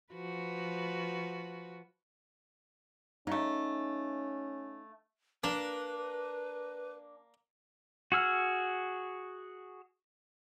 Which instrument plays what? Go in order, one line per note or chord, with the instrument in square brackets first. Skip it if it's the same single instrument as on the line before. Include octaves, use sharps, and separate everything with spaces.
[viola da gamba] F3 F#4 B4
[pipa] C#3 A3 [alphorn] C#4 [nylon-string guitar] D#4
[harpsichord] A#3 [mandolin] D4 [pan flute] B4
[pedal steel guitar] F#4 G#4 E6 F6